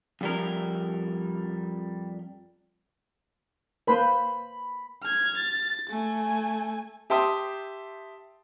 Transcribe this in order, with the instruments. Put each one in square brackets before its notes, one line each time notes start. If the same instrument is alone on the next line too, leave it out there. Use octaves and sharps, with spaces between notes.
[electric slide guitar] F2 G3 A#4
[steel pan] A#3 B4 C5 [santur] B5
[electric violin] F6 G#6
A6
A3 G#5
[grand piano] G4 E5 G5 A5 C6 D#6